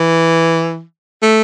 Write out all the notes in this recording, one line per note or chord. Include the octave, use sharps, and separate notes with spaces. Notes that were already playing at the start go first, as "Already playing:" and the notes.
Already playing: E3
A3